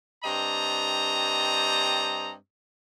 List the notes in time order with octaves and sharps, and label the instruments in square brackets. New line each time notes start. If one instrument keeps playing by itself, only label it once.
[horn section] G2 C4 G4 D#5 A5 A#5